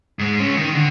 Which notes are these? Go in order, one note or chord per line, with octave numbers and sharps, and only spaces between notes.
G#2 G#3
G#3 C#4
D#3
D3